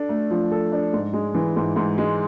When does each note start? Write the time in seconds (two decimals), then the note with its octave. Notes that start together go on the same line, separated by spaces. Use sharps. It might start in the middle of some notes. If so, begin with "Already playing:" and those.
Already playing: D4 A4
0.09 A3
0.31 F3
0.52 A4
0.72 D4
0.93 G#2
1.13 G#3
1.34 E3
1.56 G#2
1.76 G#2
1.98 G#3